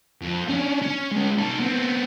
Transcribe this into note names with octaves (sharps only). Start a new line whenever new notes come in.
F2
C#4 D4
C#4
G#3 C#4
D#4 A4
B3 C4